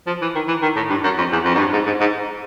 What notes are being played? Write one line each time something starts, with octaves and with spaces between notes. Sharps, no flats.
F3
E3
D#3
E3
D#3
A2
G2
F#2
F2
E2
F2
F#2
G2
G#2
G#2
G#2